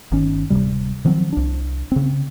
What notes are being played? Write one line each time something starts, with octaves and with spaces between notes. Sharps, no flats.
G1 D#3 C#4
D1 E2 C3 G3
D#3 F3 F#3 C4
C2 D4
C#3 C4